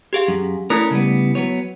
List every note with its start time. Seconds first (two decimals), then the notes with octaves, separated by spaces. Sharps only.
0.13 G4 G#4 F5
0.28 F#2
0.70 A3 C#4 E4 A4 A#4 D#6
0.91 C#3 G3 B3
1.35 F#3 B3 C#5